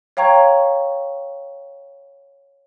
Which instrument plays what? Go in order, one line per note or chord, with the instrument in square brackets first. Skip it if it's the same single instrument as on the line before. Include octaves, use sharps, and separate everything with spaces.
[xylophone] C#5 F5 G5 A#5 C#6 G#6